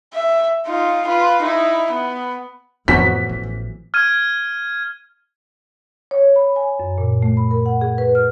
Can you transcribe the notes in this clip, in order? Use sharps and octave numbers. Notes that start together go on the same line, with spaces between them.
E5
D#4 F4
F4 B4
D#4 E4
B3
F2 A2 E3 F3 B3 F#4 B6
A1
F6 G#6 D#7
C#5
B5
G#5
F#2
A#2
A3
B5
A#4
F#5
G#4
B4
F6